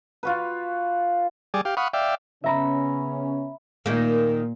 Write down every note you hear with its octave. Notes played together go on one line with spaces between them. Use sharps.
F4 F#4 B4
G3 G#4 D5
G4 F5
F5 F#5 B5 C#6 D#6
D5 E5 F5 G5
C#3 B3 C#4 E5 A#5 B5
A#2 D#3 A#3